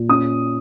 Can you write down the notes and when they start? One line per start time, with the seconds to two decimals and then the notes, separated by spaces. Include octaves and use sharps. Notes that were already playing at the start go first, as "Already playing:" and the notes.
Already playing: A#2
0.09 C#4 D#6